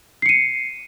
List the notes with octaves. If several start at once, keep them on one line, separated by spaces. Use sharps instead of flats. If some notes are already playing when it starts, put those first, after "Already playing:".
C7 C#7 D#7